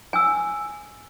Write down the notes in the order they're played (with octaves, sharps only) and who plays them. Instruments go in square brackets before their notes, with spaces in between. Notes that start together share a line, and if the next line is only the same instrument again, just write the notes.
[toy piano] G#5 E6